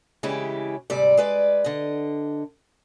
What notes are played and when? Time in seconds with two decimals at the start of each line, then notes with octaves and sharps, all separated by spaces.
0.23 C#3 E3 G#3 C#4 E4 G4
0.90 D2 G#2 C3 G3 D5
1.17 G#3 B4 D5
1.64 D3 D#5